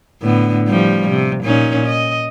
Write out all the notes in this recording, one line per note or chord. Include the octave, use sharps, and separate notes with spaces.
A2 D3 B3
A2 F3 G3
C3
A#2 C#4 D#4
D#5